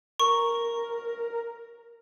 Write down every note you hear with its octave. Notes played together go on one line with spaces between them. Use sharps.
A#4 C#6